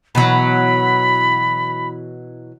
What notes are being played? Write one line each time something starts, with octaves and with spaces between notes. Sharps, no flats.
B2 E3 F#3 B5